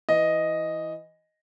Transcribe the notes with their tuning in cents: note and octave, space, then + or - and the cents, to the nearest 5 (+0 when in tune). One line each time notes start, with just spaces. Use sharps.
E3 +0 D#5 +0